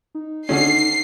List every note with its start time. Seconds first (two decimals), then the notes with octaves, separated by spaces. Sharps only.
0.15 D#4
0.49 D3 D#3 C#4 C7